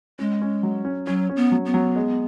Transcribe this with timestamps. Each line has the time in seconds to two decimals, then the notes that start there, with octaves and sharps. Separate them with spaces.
0.19 G#3 C#4
0.41 C#4
0.63 F#3
0.85 C#4
1.07 F#3 C#4
1.29 C#4
1.36 B3
1.52 F#3
1.66 B3
1.74 F#3
1.96 G#3